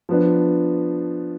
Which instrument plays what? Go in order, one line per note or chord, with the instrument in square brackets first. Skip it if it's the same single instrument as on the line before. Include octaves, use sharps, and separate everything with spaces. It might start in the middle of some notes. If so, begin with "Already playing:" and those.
[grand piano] F3 B3 D4